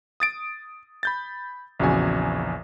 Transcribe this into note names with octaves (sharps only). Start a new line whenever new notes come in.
D#6 A6 D7
B5 G6 A6
A#1 E2 C#3 F#4 G#5